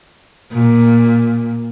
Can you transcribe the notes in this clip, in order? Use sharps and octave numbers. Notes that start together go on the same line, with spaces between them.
A#2